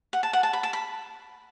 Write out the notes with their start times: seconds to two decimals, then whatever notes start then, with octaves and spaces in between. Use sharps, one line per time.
0.13 F#5
0.23 A5
0.33 F#5
0.43 A5
0.53 B5
0.63 A5
0.73 B5